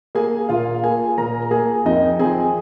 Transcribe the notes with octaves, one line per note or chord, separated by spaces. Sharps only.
A#3 G#4 G#5
A#2 F4 F5
A#3 G#4 G#5
A#2 A#4 A#5
A#3 G#4 G#5
F2 D#4 D#5
F3 C4 G#4 G#5